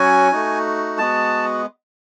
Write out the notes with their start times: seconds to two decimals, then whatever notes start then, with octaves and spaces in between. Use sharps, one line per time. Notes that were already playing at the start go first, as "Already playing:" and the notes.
Already playing: F#3 C#4 F#4 G#5
0.32 A3 D#4 F#4
0.98 G#3 B3 F#4 A5